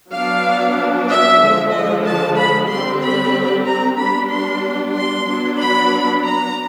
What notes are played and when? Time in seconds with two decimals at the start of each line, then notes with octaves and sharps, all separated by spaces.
0.11 F#3 B3 D4 F5
1.08 E5
1.40 D3 F3 G#3
1.72 D#5
2.04 A5
2.36 B5
2.68 D3 G3 C4 C6
3.01 B5
3.65 A#5
3.97 G3 B3 D4 B5
4.30 C6
4.94 C6
5.27 F#3 B3 D4
5.59 B5
6.24 A#5